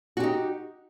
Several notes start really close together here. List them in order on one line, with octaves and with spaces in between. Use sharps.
F#4 G4 D#4